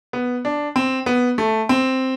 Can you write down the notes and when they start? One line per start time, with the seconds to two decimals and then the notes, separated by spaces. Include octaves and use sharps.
0.13 B3
0.45 D4
0.76 C4
1.06 B3
1.38 A3
1.69 C4